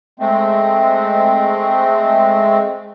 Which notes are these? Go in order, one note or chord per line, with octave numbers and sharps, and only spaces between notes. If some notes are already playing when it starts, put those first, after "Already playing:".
G#3 A3 C4